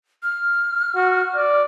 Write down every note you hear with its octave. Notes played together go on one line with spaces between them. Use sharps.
F6
F#4
D5